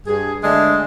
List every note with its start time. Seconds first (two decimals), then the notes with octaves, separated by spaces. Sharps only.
0.06 G2 G#4
0.44 D3 G#3 A3 D4